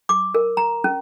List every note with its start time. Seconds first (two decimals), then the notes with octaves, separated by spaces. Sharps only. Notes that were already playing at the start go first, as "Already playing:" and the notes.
0.09 D6
0.35 A#4
0.57 A#5
0.84 C#4